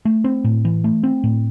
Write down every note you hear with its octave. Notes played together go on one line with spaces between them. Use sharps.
A3
C4
A2
E3
A3
C4
A2